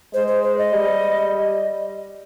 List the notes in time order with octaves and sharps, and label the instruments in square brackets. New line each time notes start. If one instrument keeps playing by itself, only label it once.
[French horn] G#3 [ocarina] C5
[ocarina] C5
C5
D#5
[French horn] G3